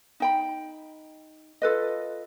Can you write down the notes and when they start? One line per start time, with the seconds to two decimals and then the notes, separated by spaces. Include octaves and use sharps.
0.20 D#4 G5 B5
1.62 F4 A4 B4 D#5